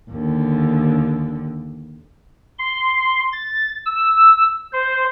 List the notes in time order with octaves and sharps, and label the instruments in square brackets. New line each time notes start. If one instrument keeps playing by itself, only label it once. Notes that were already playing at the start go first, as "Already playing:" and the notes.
[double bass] D#2 D3
[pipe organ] C6
A6
E6
C5